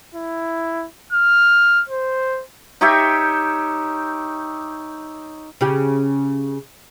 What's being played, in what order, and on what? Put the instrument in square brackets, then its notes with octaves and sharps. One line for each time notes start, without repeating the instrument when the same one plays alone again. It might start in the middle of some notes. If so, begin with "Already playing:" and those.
[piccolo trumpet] E4
F6
C5
[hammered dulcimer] D#4 G4 C#5 E5
[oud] C#3 C#4 G4